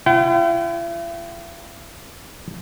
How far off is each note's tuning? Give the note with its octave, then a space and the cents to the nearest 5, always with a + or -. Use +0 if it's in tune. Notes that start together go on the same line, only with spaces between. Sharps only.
E4 +45 G5 -45